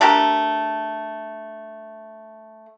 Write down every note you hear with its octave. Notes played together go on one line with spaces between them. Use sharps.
A3 D4 G4 A#4